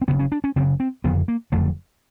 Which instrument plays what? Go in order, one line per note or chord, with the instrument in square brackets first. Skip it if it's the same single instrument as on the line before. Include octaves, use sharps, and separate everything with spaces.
[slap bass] C4
F#1 F#2 C#3 B3
C#4
D4
C#4
F#1 F#2 C#3 C4
C4
F#1 F2 D3 B3
A#3
F#1 F2 D3 A3